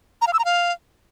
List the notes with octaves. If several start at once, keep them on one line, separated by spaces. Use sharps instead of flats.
A#5
F5
E6
A#5
F5